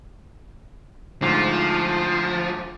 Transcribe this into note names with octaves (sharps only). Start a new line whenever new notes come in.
D2 G#2 F3